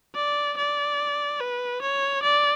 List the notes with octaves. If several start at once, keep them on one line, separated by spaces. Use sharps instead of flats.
D5
D5
B4
C#5
D5